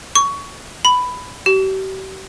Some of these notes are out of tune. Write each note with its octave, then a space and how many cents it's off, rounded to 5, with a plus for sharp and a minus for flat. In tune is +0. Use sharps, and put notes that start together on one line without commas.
C#6 +20
B5 +10
G4 -40